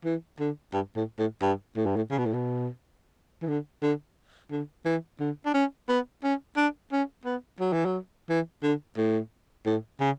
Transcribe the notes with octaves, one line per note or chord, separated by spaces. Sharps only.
E3
D3
G2
A2
A2
G2
A2
G2
A2
C#3
B2
A2
B2
E3
D3
D3
D3
E3
D3
D4
C#4
B3
C#4
D4
C#4
B3
F#3
E3
F#3
E3
D3
A2
A2
C#3